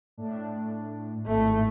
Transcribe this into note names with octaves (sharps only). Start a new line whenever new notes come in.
A2 D4
G#1 A2 A3